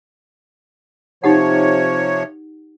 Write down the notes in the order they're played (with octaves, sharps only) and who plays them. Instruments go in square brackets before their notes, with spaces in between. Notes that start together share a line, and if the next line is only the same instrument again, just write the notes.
[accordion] C3 F3 C#5 [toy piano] D#4 G4 F#5